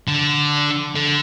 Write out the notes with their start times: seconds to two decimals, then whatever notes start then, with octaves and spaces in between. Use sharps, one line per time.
0.08 D3
0.95 D3